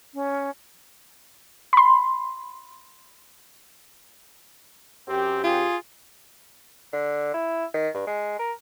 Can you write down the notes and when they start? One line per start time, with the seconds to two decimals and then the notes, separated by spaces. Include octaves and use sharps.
0.14 C#4
1.73 B5 C6
5.08 F#2 C4 G4
5.44 F4 G#4
6.93 D3
7.34 E4
7.74 D#3
7.94 G2
8.07 G#3
8.39 A#4